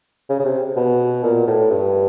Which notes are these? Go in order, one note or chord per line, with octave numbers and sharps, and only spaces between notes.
C#3
C#3
C3
B2
A#2
A2
G2